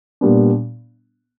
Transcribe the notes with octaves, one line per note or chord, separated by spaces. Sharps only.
A#2 G3 B3 D4